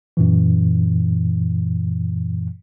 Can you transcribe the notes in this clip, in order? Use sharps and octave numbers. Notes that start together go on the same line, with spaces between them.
F#2 A#2 E3